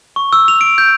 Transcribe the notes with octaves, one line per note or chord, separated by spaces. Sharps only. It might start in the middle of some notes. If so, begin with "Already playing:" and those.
C#6
E6
F7
D7
G6